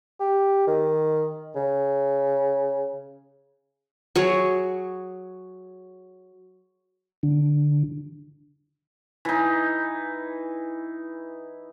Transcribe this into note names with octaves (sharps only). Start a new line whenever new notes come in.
G4
D#3
C#3
F#3 G#4 C#5
D3
E3 D#4